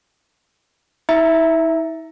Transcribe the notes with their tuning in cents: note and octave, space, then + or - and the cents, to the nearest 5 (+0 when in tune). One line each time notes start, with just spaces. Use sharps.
E4 -45 E5 +0 A#5 +0